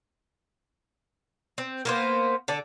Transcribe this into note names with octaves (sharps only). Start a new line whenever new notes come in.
C4
A#3 B3 C5
D3 A4 D5